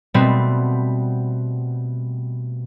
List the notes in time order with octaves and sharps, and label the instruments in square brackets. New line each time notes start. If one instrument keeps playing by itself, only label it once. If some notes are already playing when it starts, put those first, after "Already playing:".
[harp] B2 G3 A3 B3 C4